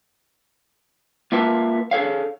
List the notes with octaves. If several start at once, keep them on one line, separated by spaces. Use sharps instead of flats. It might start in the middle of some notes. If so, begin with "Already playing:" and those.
A#3 F4 A#4 B4 E5 A5
G#4 A4 C#5 F5